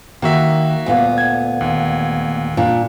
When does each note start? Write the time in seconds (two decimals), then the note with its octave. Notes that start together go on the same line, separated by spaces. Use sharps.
0.22 D#3 A#3 F#4 E5
0.86 D2 A#2 B3
1.18 G#6
1.61 D#2
2.57 A#2 D4